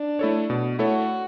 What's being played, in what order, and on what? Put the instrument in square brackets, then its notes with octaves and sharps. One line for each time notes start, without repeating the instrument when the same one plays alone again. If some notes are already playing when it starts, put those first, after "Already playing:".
Already playing: [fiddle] D4
[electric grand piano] A3 E4 A4 C#5
B2
[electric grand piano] A3 E4 A4 C#5 [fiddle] F#4